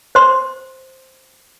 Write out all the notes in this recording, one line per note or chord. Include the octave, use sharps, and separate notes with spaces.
C5 C6